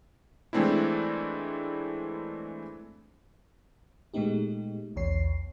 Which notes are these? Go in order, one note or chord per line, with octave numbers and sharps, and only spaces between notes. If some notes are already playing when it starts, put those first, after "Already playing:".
E3 G#3 A3 C4 D4 E4
A#2 G#3 A3 B3 D#4 G4
B1 E2 C#5 C7